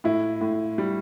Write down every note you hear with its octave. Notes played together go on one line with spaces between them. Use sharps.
A2 E4
A2
G3